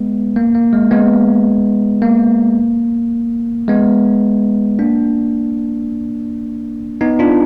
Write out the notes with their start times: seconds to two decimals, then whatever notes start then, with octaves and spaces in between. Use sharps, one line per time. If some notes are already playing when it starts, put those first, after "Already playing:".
Already playing: G#3 B3
0.36 A#3
0.55 A#3
0.73 G#3
0.91 G#3 B3
2.02 A#3
3.68 G#3 B3
4.79 A#3 D4
7.01 B3 D#4
7.19 D4 F4